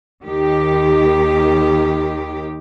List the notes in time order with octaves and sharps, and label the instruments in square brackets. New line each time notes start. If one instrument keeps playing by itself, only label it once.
[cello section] D#2 D#3 G4